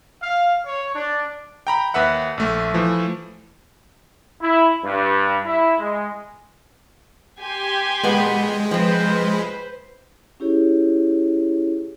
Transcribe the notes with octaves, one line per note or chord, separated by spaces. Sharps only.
F5
C#5
D4
G5 A#5 B5
D#2 B4 E5 F#5
A#1 A3
E3 F3 A3
E4
G2
E4
G#3
G4 G#5 C6
A#2 G#3 B3
F3 C4 B4 C5
C#4 E4 G4 G#4 C#5